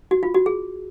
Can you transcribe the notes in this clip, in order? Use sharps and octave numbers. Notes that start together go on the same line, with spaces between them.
F#4
F4
F#4
G#4